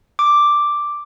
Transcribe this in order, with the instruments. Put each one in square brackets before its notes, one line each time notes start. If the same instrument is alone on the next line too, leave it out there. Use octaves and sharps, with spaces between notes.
[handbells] D6